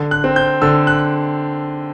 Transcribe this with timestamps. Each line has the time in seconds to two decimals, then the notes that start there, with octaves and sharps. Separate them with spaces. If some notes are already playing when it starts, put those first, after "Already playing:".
Already playing: D3
0.11 F#6
0.24 C4
0.36 G6
0.62 D3 E6
0.87 F#6